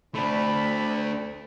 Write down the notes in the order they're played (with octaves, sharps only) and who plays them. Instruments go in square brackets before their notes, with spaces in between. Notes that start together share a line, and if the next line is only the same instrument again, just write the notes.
[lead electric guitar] A3 D4 [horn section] C4 A5 B5